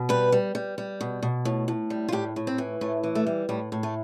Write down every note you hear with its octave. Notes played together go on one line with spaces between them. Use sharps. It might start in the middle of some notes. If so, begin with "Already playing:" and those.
Already playing: B2
G3 B4
G3
G3
G3
B2
B2
A2
A2
G3
F4
A2 G4
A2
C4
E3
A2 A3
E3
A3
G3
A2 G3
A2
A3